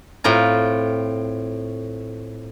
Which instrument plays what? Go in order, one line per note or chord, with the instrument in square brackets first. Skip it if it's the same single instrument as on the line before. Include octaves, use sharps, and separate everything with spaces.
[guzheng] A2 C4 F4 A#5